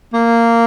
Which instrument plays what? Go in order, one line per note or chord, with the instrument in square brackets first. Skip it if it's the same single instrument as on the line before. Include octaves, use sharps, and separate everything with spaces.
[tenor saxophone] A#3